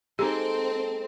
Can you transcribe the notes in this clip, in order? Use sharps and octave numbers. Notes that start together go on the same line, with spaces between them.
G#3 A#3 C4 D#4 G4 A4